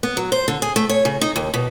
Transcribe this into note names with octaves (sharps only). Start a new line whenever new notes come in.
B3
F#3
C5
D3
G#4
A3
C#5
C#3
D#4
D#2
B2